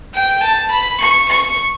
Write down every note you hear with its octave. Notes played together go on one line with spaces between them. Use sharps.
G5
A5
B5
C#6
C#6